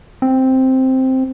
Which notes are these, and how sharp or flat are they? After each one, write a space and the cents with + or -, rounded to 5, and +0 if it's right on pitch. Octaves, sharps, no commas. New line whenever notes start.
C4 +0